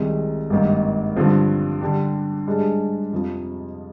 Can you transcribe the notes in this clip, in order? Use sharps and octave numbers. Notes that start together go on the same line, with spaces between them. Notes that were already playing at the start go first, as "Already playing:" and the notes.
Already playing: C2 C3 D#3 G#3 D#4
G#1 G2 D#3 A#3
G2 D3 F3 C4
D3 G3 D4 G4
G#2 G3 D4 G#4
F2 C3 F3